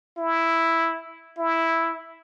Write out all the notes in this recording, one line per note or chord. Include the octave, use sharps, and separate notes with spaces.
E4
E4